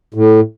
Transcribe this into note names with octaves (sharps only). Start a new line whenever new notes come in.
A2